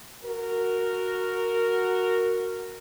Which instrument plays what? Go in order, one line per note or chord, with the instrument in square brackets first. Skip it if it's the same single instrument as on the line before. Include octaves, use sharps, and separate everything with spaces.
[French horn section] F#4 A#4